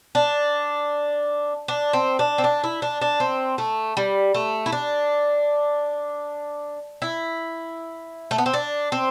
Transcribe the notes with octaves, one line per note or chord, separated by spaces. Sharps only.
D4
D4
C4
D4
C4
D4
E4
D4
D4
C4
A3
G3
A3
E4
D4
E4
A3
B3
C4
D4
C4